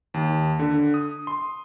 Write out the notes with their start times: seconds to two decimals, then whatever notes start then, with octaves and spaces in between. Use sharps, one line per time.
0.14 D#2
0.59 D3
0.94 D#6
1.27 C6